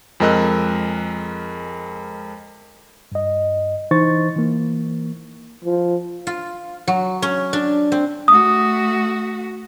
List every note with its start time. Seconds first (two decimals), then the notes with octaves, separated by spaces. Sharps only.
0.20 F2 G#3 A#4 D#5 E6 F#6
3.12 G2 D#5
3.91 E3 D#4 C5 C#6 A6
4.36 E3 A#3
5.65 F3
6.27 F4
6.88 F#3
7.22 C#4
7.53 D4
7.92 C4
8.28 A3 F#4 D#6